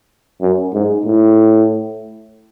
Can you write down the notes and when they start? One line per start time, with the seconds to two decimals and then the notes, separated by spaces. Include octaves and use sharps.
0.41 F#2
0.73 G#2
1.06 A2